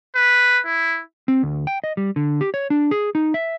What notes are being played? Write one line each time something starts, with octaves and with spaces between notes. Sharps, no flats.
B4
E4
C4
D2
G5
D#5
G3
D3
G4
C#5
D4
G#4
D#4
E5